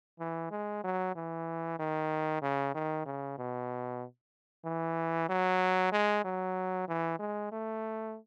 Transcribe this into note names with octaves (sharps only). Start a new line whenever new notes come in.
E3
G#3
F#3
E3
D#3
C#3
D#3
C#3
B2
E3
F#3
G#3
F#3
E3
G#3
A3